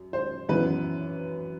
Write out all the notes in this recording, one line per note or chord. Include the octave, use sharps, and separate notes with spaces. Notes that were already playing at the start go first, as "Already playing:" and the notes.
Already playing: F#2
C5
F#2 E3 B3 E4 B4